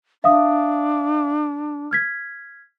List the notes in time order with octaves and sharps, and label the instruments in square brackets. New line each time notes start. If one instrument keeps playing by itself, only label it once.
[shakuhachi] D4 [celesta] E5 F5 D#6
[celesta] F6 G#6 B6